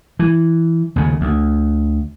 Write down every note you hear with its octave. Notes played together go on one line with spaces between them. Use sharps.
E3
D#2 C#3
D2